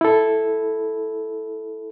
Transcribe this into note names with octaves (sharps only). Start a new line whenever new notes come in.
E4 A4